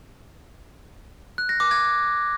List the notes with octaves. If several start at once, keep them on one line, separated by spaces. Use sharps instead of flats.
F#6
A#6
D6
G#6